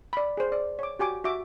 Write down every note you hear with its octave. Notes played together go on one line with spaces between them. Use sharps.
D5 B5
G#4 C5
D5
C#5 D6
F#4 G4 G#5 D6
F#4 E5 D6